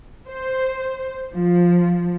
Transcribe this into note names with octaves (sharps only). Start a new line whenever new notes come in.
C5
F3